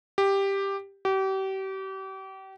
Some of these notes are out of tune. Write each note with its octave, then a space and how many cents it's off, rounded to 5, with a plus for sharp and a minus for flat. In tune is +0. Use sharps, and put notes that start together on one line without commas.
G4 +5
G4 -35